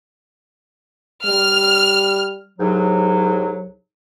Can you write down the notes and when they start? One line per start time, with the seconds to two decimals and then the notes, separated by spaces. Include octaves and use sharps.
1.26 G3 F6
2.59 C2 G#2 F#3